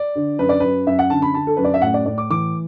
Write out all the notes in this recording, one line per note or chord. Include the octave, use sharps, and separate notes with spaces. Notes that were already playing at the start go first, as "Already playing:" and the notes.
Already playing: D5
D3
F#2 B4
D5
F#2 B4
F#2 E5
F#5
D3 A5
B5
D3 A5
A4
F#2 B4
D5
E5
A2 F#5
D5
A2 D5
D6
E3 D6